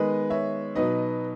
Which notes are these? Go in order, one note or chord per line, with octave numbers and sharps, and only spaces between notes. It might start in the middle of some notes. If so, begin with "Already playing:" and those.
Already playing: D#3 G#3 B3 B4 D#5
C#5 E5
B2 F#3 B3 D#4 B4 D#5